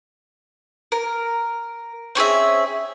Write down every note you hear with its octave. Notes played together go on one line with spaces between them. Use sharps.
A#4
C4 C#4 G#4 E5